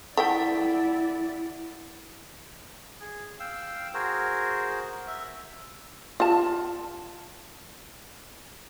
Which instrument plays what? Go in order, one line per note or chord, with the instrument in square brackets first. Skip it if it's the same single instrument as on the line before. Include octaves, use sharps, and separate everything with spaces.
[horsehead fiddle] E4 D5 [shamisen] A4 E5 G5 [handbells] F#5
[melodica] G#4
F5 G5 E6
F#4 G#4 A#4 C5
E5
[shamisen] F4 A5